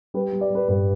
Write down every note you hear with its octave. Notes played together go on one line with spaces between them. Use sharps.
G3 B4
G3
D5
G3 B4
G2 B4